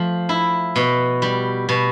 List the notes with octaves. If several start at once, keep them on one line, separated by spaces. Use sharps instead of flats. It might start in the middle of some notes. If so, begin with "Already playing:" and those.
Already playing: F3 A3
E4
B2
G3
B2